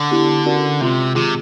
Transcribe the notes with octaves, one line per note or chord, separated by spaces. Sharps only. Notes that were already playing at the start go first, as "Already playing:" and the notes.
Already playing: D3
B3 E4 G4
C#4 F#4 A#4 D5
C3 G#3 C4 F4
C3 D#3 G#3 C4 F4 G#4